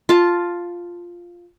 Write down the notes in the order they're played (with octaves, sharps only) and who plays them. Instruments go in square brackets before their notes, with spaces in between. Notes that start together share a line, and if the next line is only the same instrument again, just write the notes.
[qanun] F4 A5